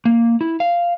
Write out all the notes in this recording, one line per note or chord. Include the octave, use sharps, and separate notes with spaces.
A#3
E4
F5